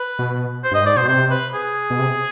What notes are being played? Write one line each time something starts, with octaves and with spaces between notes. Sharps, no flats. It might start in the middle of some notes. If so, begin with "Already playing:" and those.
Already playing: B4
B2
C5
G2 D#5
G#2 D5
B2 C5
C3 C5
B4
G#4
B2
C3